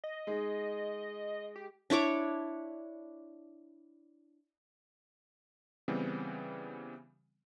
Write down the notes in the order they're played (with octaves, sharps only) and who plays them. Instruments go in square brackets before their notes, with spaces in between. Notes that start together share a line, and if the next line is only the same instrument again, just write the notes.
[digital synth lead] D#5
[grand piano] G#3 D#4 G#4
[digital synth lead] G4
[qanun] D4 E4 C#5 D6
[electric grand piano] C#3 E3 G3 B3 C4